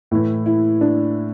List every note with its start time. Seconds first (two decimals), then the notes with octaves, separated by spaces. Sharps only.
0.11 A2 E3 E4
0.46 E4
0.81 D4